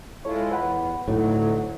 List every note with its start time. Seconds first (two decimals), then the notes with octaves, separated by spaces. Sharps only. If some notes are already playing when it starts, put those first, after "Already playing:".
0.25 G#3 E4 F4 A4 C#5
0.51 E2 B4 F#5 B5
1.08 D2 A2 F#3 D#4 F#4